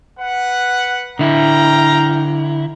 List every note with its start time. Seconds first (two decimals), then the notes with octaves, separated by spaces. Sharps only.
0.19 B4 F#5
1.19 D3 E4 F5 G5 A#5